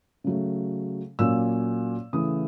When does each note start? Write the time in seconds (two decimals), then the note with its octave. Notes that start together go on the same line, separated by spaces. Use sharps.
0.24 C#3 F#3 A3
1.19 A#2 F#3 A#3 C#4 E6
2.13 C#3 E3 A3 D#6